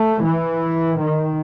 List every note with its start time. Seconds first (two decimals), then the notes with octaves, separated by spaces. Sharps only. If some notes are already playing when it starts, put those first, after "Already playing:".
Already playing: A3
0.24 E3
0.99 D#3